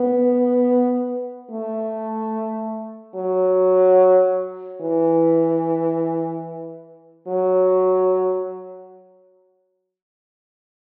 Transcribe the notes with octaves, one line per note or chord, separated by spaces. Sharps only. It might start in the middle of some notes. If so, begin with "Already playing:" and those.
Already playing: B3
A3
F#3
E3
F#3